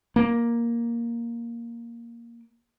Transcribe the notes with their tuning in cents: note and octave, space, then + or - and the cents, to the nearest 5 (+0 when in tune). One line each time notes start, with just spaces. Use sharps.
A#3 +5